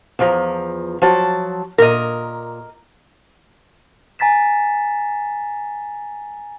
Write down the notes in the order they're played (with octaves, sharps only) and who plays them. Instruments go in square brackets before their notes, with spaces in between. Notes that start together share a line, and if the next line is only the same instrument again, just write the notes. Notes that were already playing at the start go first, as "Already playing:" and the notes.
[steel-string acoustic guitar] E2 F3 A#5
F3 F#3 A5
[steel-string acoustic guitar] A#2 [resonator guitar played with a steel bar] A#4 D#5
[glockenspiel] G#5 A#5 A6 B6 E7